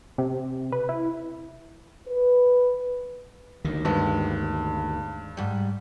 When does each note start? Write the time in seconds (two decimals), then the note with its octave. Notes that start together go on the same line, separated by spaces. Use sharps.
0.18 C3
0.72 B4
0.89 E4
2.08 B4
3.65 D2 D#3
3.85 G2 G#3 B3 C4
5.37 G#2 G3